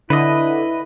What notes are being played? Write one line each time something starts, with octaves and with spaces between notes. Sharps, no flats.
D3 E4 B4 D#5